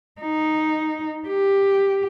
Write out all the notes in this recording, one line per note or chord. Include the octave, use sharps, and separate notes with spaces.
D#4
G4